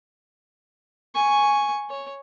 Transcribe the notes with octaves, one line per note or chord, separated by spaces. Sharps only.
G#5 C#6
C#5